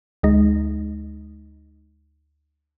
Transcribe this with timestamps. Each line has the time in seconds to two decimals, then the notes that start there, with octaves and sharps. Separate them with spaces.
0.23 D2 G#3 D#4